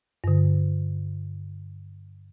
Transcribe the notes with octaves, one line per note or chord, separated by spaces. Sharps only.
G2 D3